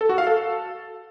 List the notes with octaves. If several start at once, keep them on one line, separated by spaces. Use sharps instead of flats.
A4
F#4
F5
A4